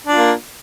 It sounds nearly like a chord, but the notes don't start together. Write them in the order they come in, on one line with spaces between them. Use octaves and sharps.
D4 F4 A#3